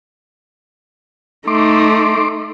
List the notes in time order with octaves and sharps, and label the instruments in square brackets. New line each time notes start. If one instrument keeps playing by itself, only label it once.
[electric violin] A3 D#4 [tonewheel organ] C6 D6